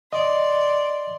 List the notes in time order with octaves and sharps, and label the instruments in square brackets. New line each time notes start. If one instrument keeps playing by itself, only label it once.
[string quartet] D5 C6 [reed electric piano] D#5